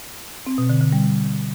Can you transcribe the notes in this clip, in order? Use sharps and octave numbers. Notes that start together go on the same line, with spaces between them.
C4
B2
D3
D3
G3